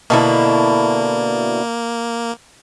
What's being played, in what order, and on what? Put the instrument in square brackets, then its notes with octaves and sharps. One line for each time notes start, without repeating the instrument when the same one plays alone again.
[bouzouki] B2 D3 E4 [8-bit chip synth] A#3